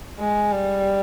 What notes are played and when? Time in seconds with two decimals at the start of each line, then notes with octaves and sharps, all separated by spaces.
0.20 G#3
0.52 G3